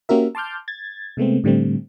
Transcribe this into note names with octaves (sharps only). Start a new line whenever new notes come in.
A#3 C#4 F#4 G4 A#4 E5
A5 C6 D6 F6 G6
G#6 A6
C3 G#3 A3 B3 C4
A2 D3 G3 A3 C4